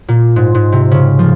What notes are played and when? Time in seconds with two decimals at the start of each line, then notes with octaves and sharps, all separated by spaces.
0.08 A#2
0.36 G#2
0.55 G#2
0.72 C3
0.91 C#3
1.19 F3